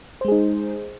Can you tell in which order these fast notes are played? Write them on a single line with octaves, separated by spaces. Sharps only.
C5 G#3 G#4 D#4